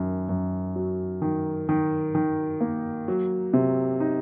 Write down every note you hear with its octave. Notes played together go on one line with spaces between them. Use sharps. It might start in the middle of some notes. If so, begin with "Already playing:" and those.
Already playing: F#2 D#3
F#2
F#3
D#3
D#3
D#3
A#3
F#3
C3
D#4